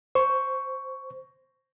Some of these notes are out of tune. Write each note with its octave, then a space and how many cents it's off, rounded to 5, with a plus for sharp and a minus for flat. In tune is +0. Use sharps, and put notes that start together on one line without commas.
C5 +0 C#6 +10